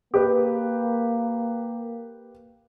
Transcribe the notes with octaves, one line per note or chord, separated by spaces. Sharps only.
A#3 G4 B4